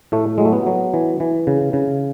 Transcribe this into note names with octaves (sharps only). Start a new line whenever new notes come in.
A2 A3
F#3 G#3
A3
B3
F#3
E3
E3
C#3
C#3